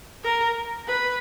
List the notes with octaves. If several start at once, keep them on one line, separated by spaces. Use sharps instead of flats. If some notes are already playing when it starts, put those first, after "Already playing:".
A#4
B4